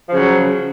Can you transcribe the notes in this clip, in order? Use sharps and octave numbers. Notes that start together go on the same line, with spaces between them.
C#3 F3 F#3